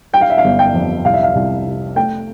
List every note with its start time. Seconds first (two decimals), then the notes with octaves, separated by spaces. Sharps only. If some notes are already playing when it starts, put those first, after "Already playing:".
0.13 G3 G5
0.21 F5
0.30 E5
0.38 F5
0.44 G1
0.59 G5
0.74 F2
1.05 C2 F5
1.14 E5
1.23 F5
1.35 C2
1.66 C3
1.96 A3 G5